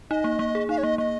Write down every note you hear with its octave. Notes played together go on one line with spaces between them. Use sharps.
D#4 D#5
A#3
A#3
G#4
D#4 F5
C#5
A#3 D#5
A#3 D#5